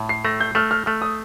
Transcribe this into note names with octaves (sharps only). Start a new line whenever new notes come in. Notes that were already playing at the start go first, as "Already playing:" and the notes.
Already playing: A2
C7
A3 A#6
G6
A3 F6
F6
A3 F6
D#6